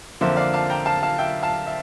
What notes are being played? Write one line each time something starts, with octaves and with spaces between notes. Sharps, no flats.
F2 D3 F3 A#3 C5 E5
D5 F5
F5 A5
G5 A#5
F5 A5
F5 A5
E5 G5
F5 A5
E5